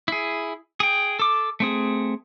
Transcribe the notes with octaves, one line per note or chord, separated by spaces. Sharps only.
E4 G#4
G#4 G5
A4 D6
A3 C4 G#4